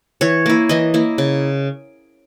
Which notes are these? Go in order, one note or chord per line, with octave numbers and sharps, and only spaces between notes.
E3 C#5
A#3 E4
E3 D#5
A#3 E4
C#3